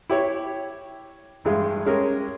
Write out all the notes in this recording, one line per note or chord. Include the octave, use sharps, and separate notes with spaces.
E4 G4 C#5
A1 G2 G#3 F5
G#3 C#4 G4 A#4